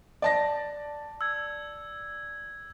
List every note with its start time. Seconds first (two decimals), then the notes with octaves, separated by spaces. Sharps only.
0.22 D5 A5 A#6
1.21 E6 G#6